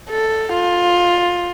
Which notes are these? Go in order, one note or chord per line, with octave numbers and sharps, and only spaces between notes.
A4
F4